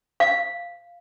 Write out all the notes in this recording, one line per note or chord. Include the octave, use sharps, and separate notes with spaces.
F5